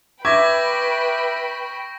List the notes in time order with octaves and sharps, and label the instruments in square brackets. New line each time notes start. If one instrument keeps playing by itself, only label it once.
[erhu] B4 [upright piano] E5 D6 G#6 [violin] G5 B5 [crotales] C#6 A#6